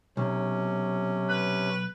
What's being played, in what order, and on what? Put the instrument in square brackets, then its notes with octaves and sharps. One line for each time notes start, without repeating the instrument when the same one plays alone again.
[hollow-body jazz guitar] B1 [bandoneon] C3 C#4
[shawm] B4